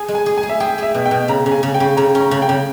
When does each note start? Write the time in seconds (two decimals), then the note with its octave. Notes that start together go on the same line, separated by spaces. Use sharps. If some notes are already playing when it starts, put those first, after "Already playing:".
Already playing: G#4 G#5
0.08 G#3
0.15 G#5
0.26 G#4
0.38 G#5
0.43 G#4
0.49 E5
0.60 G#4 G5
0.78 G#4 E5
0.95 B2
1.05 G5
1.11 B2
1.28 C#3 A#5
1.46 C#3
1.52 G#5
1.63 C#3
1.74 G5
1.80 C#3
1.97 C#3 A#5
2.15 C#4
2.21 A#5
2.31 C#3
2.42 G5
2.49 C#3